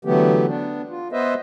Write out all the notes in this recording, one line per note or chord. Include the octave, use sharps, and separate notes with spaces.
D3 E3 F#3 A3 B3 G4
B3 D4
F4
B3 B4 C5 D#5 E5